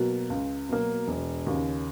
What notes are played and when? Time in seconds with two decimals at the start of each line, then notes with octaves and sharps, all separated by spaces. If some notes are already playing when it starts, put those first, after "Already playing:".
Already playing: B2 F#3 A#3
0.30 C#2
0.69 B2 F#3 A#3
1.08 E1
1.47 D#2 C#3